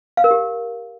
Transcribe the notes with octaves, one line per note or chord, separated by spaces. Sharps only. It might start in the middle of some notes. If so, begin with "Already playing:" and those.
F5
A#4
G4